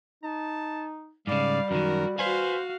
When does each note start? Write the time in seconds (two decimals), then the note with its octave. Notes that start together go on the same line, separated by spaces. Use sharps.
0.24 D#4 A5
1.27 G#2 C#3 G3 D5 F5
1.71 F#2 D#3 F#4 A#4
2.19 F#4 B4 C5 F5 G#5